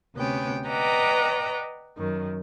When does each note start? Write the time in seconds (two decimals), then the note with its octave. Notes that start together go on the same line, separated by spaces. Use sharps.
0.15 D2 C3 B3 C#4 G5
0.68 B4 D5 D#5 F#5 G5 A#5
1.97 F#2 D#3